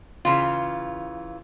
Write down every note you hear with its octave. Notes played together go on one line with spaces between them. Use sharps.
C#3 E3 F4